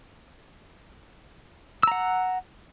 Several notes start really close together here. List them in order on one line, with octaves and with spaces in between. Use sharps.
E6 A#5 F#5